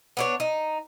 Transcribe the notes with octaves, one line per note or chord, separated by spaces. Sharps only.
B3 D4 C#5
D#4